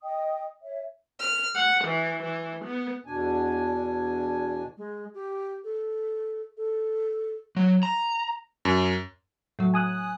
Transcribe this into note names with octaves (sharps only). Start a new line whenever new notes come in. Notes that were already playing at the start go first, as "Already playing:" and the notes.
D#5 G5 D#6
C#5 E5
F6
F#5
E3
E3
B3
E2 B2 D4 G#5
G#3
G4
A4
A4
F#3
A#5
F#2
A2 F#3
G#5 D#6 F#6